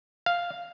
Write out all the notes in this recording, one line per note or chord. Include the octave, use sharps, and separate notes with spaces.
F5